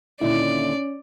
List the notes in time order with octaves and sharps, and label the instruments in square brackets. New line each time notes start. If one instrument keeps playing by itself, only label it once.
[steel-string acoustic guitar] D#2 A#2 D3 [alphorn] C#4 [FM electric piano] E4 [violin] D5